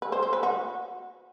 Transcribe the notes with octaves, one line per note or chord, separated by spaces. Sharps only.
B4
C5
C5
B4
F#4